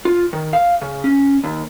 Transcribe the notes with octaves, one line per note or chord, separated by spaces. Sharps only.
F4
D#3
F5
C#3
C#4
D#2